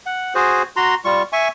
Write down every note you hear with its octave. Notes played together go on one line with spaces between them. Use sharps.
F#5
F#4 G#4 C5
F#4 A#5 C6
G3 F4 C#6
E5 G#5 C#6